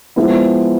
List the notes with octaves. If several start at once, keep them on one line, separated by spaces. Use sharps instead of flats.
F3 G#3 B3 E4